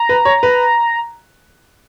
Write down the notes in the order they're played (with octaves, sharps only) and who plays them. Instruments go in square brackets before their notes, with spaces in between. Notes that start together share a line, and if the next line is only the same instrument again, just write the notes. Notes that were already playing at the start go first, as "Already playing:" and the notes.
Already playing: [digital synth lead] A#5
[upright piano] B4
C#5
B4